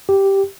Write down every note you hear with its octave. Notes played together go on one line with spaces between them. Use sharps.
G4